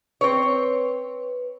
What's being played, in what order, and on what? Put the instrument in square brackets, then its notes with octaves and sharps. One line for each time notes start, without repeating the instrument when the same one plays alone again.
[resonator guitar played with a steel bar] C4 C#5 [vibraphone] B4